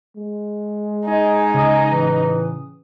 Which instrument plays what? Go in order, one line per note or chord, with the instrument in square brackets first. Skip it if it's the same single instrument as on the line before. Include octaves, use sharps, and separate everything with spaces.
[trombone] G#3
[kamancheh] D#4 [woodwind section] D#5 G#5
[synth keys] C#3 D#6
[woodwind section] A2 E3